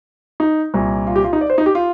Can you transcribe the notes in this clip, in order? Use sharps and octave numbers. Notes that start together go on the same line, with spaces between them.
D#4
C2 A#2
F4
G4
F4
D#4
D5
C5
D#4
G4
F4